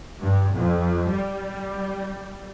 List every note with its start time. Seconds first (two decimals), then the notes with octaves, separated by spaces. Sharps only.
0.20 G2
0.54 F2
1.09 G3